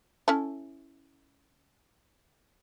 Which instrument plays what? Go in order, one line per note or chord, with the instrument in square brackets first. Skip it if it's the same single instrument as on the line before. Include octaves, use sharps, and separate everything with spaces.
[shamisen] C#4 E4 A4